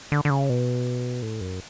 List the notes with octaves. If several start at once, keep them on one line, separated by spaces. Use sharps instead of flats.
D3
D3
C#3
B2
A2
F#2